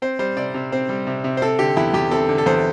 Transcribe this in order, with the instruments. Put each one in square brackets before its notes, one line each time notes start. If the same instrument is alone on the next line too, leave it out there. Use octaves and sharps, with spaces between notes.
[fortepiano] C4 C5
G3 C5
C3 D5
C3
C4 C5
G3
C3
C3
C5
C4 A4
D3 G4
E2 E4
E2 G4
C4 A4
D3
A4
E2 C5